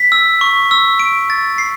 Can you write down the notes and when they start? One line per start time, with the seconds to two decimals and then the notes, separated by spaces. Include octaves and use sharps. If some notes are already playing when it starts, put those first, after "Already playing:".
Already playing: B6
0.12 E6
0.41 C#6
0.71 E6
1.00 D7
1.30 A6
1.58 C7